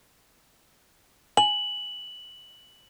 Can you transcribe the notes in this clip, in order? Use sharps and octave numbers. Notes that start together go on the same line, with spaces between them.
G#5 F#7